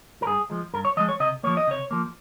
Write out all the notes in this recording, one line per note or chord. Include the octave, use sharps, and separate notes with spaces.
A#4
G2 G#4
F3 G#3
G2 A#4
C#5
F3 G#3 D#5
C#5
C3 D#5
F3 A#3 C#5
D#5
C3 C#5
F3 A#3